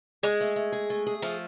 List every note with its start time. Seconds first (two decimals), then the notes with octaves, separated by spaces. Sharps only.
0.23 G#3 G#4
0.41 A3
0.56 A3
0.72 G#4
0.90 A3
1.07 G#4
1.22 F3 A3